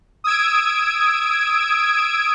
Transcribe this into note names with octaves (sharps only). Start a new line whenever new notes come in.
D#6 E6 G#6 D7